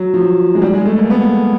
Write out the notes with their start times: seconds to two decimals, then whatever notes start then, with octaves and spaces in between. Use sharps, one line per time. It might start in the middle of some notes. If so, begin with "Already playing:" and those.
Already playing: F#3
0.14 F3
0.55 G#3
0.62 G3
0.74 G#3
0.86 A3
0.98 A#3
1.10 B3